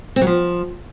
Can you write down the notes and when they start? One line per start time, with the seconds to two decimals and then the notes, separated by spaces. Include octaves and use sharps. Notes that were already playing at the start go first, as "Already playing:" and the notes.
0.16 C4
0.21 F#3
0.27 F3